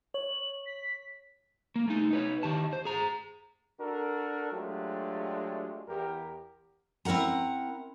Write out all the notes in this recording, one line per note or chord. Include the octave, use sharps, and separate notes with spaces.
C#5 F#7
B6
A#3
A3 D#4
D#4 B4 C#5
D#3 G4 A5
C5
G#4 A#5
D4 F#4 A4 A#4
F#3 G#3 A3 D4 F4 G4
E2 G4 A#4
C4 E4 A#4 F#5 A#5